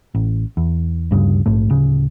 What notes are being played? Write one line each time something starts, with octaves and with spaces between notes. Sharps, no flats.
A1
E2
D2 G2 A#2 C#3
A#1 G#2 A3
D1 C#3